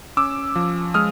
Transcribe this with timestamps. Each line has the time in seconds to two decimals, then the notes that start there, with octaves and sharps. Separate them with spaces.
0.17 C#4 D6 E6
0.56 F3
0.94 G#3 D#6 F6